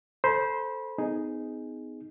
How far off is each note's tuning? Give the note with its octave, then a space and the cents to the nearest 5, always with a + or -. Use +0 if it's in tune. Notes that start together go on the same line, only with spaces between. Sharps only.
A4 +0 C5 +0 B5 -30
B3 +40 D#4 +0 G#4 +0